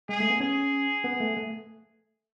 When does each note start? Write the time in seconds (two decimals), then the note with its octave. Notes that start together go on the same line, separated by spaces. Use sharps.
0.09 G#3 G#4
0.20 A3
0.30 B3
0.40 C#4 G#4
1.04 B3
1.20 A3
1.37 A3